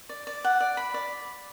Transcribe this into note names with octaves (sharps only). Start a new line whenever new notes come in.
D5
D5
F#5
D5
B5
D5